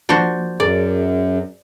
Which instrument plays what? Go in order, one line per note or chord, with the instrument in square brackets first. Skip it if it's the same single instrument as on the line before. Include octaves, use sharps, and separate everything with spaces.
[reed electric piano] F3 A#3 [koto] D4 F#4 C5
[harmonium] F#2 [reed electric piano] G#4 A#4 [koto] D5